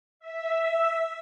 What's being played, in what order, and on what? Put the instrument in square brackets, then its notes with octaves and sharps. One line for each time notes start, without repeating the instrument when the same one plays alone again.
[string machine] E5